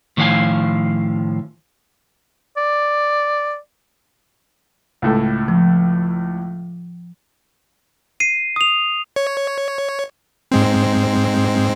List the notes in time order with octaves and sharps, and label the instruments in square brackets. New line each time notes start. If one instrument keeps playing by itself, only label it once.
[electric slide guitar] A2 D#3 F3 B4 F5 G#5
[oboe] D5
[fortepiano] C#2 A2 A4
[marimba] F3
[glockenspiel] C7 D#7
D#6 F7
[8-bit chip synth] C#5
G#2 G#3 C4